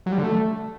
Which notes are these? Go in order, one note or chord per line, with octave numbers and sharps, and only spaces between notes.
F#3
G3
D3
A3